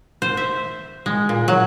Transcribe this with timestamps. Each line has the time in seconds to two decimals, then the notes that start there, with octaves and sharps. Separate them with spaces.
0.22 C5
0.37 E5
1.06 G#3
1.29 A#2
1.48 F#3